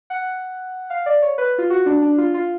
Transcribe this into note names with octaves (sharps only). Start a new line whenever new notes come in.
F#5
F5
D5
C#5
B4
F4
F#4
D4
D4
F4
F4